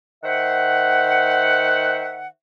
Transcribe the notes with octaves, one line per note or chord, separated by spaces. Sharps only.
D#3 C5 E5 F#5